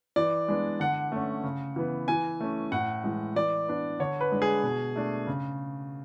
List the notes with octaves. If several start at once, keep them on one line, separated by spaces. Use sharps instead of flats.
E3 D5
G#3 B3 D4
D3 F#5
A3 C#4
C#3
E3 B3
E3 G#5
A3 C#4
A2 F#5
E3 G#3
E3 D5
B3 D4
D3 C#5
B4
G#3 D4
G#4
B2
A3 D4
C#3